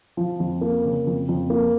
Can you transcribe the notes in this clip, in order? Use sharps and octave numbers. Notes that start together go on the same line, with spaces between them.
F3
F2
A#3
C#3
F2
F2
A#3